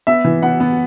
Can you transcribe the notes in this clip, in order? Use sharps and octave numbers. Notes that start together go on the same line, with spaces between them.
B3 E5
E3
B3 F#5
B3